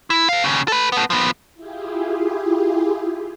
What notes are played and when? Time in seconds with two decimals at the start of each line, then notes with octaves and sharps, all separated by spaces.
0.10 E4
0.29 A4 F5
0.43 D#2 C#3
0.68 A4 B4
0.92 A3 B3
1.10 F3 B3
1.54 E4 F4 G4 G#4